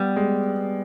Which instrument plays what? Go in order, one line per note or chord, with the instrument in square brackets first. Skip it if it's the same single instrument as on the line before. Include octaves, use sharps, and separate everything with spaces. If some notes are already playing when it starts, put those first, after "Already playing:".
Already playing: [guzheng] G3 [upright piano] B3
[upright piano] G#3